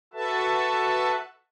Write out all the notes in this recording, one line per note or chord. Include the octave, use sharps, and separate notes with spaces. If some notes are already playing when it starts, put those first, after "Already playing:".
F#4 A4 B4 E5 A5